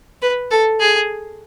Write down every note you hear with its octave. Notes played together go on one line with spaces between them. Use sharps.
B4
A4
G#4